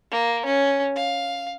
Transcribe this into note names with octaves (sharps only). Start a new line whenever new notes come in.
A#3
C#4
F5